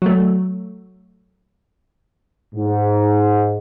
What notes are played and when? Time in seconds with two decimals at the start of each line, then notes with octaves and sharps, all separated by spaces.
0.02 F#3 A3
2.55 G#2